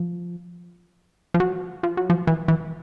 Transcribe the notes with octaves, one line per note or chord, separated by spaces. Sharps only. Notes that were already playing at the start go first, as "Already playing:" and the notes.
Already playing: F3
F3
F#3
F3
F#3
F3
E3
E3